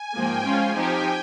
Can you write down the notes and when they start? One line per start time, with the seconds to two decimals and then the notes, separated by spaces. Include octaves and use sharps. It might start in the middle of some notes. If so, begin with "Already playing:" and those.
Already playing: G#5
0.15 G#2 F3 A#3 G5
0.44 F3 G#3 C#4 F4 G#5
0.74 F3 C4 D#4 G4 G5